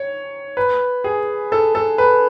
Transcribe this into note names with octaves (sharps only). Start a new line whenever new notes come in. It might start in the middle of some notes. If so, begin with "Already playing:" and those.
Already playing: C#5
B4
G#4
A4
A4
B4